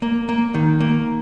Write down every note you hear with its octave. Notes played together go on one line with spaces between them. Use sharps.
A#3
A#3
D#3
A#3